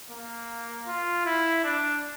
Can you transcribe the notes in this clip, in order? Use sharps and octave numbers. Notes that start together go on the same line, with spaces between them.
A#3
F4
E4
D4